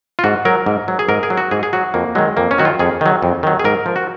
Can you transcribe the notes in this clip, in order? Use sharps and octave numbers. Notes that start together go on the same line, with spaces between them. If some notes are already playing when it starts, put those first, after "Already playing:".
F4
G#2 F#4
F#3 A#4
G#2
F#3
G#4
G#2 A#4
G#4
F#3
F#4
G#2 G#4
G#4
F#3 F#4
F2 A#3
D#3 F#3 G#3
F2 A#3
C#4
D#3 F#3 F#4
F4
F2 G#4
D#3 F#3
F2
D#3 F#3
G#4
G#2 A#4
F3
F#4